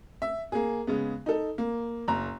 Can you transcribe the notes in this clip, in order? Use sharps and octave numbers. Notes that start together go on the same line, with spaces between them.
E5
A#3 G#4
C#3 G#3 B3
D#4 A4
A#3
F#1 A#5